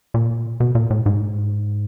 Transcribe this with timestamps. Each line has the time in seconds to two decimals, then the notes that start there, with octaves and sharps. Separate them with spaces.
0.14 A#2
0.60 B2
0.75 A#2
0.90 A2
1.06 G#2